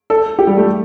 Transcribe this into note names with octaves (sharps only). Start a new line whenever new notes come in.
A4
G4
G3
A3